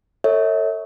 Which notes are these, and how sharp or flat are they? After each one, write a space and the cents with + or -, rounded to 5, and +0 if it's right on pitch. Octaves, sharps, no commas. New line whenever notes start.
A4 +35 C#5 +0 E5 -40